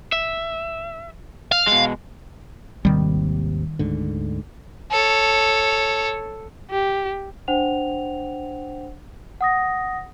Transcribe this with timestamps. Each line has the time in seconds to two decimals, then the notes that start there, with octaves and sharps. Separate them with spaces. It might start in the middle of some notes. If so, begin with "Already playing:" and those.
0.12 E5
1.52 F5
1.67 B2 G#3
2.85 G#1 D#2 C3 D#3 G3
3.79 D2 G#2 D3
4.91 A4 C#5
6.70 G4
7.48 D4 C5 F#5 G5 F7
9.41 F#5 D#6 A#6